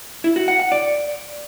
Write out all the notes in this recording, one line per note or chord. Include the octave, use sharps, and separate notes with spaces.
E4
F#4
F#5
F#5
D5